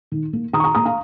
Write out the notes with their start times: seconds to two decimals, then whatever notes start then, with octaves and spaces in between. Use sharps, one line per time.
0.12 D#3
0.33 A#3
0.53 D#3 A#5 D#6
0.60 C#6
0.64 A#5 D#6
0.75 A#3 A#5 D#6
0.85 F5 A#5